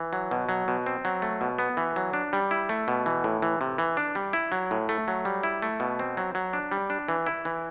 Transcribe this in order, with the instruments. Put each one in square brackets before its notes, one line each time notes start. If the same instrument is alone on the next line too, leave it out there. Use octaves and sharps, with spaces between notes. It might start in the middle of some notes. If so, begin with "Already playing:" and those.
Already playing: [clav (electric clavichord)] E3
F#3
B2
F#3
B2
C4
F#3
A3
B2
B3
E3
F#3
D4
G3
E4
A3
B2
E3
A2
E3
C3
E3
D4
G3
E4
F#3
A2
A3
F#3
G3
E4
A3
B2
C4
F#3
F#3
D4
G3
D4
E3
E4
E3